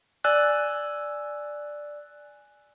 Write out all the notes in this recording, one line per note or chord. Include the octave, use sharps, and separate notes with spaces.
D5 G#5 E6 F#6